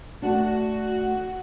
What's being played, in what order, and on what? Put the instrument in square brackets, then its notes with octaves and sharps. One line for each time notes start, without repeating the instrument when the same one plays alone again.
[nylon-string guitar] A3 D4 [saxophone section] F#4